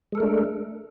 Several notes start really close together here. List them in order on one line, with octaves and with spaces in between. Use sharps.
G#3 A4 A#4 A3 D4